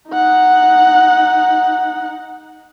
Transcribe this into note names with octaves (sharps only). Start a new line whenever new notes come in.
D#4 F#5